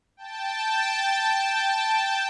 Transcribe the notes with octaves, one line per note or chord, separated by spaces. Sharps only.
G5 A5